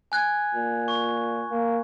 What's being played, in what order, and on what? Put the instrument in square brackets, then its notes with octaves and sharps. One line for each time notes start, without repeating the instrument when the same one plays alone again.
[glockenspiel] G#5 F#6 G#6
[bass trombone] A#2
[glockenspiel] C#6
[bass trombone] A#3